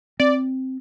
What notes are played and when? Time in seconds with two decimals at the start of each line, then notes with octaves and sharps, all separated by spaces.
0.20 C4 D5